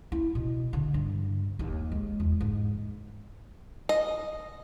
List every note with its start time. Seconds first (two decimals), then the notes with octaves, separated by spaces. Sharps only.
0.12 E4
0.35 B2
0.73 D3
0.94 G2
1.59 D#2
1.92 G#3
2.20 E2
2.41 G#2
3.89 D#5